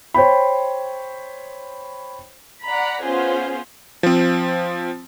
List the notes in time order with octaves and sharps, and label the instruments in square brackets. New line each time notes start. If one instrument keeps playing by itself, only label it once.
[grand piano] C5 C#5 G5 B5
[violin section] D5 F#5 A#5 B5
B3 C#4 F4 G#4 C5
[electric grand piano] F3 C4